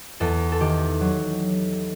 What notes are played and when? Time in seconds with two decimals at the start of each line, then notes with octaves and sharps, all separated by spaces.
0.20 E2 A4
0.52 A4
0.61 D#3 G4
1.01 F#3